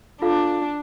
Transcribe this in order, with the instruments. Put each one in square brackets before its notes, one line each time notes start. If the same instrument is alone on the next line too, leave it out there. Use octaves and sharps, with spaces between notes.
[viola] D4 [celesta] F4 A4 F5